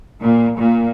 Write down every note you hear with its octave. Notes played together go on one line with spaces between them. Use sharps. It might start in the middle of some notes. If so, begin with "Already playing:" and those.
A#2
A#2